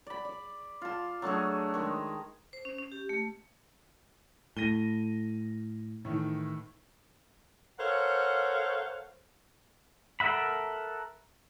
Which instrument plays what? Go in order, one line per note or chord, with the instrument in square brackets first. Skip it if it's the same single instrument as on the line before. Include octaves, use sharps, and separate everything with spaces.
[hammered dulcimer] D5 B5
D5
F4 A5
F#3 A3 D4 G#4
D#3 G#3
[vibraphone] C5
C#4
C#4
G4
A3
[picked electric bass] A2 [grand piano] A#6 D#7 G7
[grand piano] A2 D#3 E3
[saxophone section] A4 A#4 C5 C#5 F5 F#5
[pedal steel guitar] A4 A#4 E5 F#5 B5